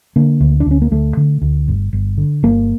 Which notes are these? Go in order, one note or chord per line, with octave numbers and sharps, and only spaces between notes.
D3 A#3
D2
D4
D2 C#4
A#3
D2 A3
D3
D2
G1
G1
D3
G1 A#3